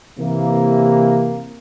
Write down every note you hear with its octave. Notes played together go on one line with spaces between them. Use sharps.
C3 E3 A#3